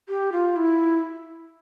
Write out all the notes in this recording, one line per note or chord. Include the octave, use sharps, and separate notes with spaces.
G4
F4
E4